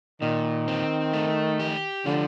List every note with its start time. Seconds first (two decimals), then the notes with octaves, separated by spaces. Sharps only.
0.21 A#2 D#3
0.68 C4
1.13 A3
1.60 G4
2.06 D3 F3